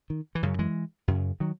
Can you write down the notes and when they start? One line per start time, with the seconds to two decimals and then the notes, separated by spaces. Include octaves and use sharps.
0.10 D#3
0.35 E3
0.43 F#2 C#3 F#3
0.59 E3 G#3
1.08 F#2 C#3
1.40 D#3 F#3